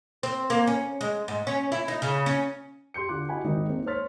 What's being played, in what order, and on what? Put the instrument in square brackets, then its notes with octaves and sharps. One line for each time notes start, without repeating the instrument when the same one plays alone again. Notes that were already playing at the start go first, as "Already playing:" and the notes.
[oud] C4
A#3
C#4
G#3
G#2
C#4
E4
D#4
C#3
C#4
[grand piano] G4 C6 G6 C#7
D3 F4 G4 D6 F#6
E4 F#4 D#5 F#5 G#5 B5
G#1 D#3 D#4
G#3 A#3 C4 D#4
C5 C#5 C6 F6 A6 B6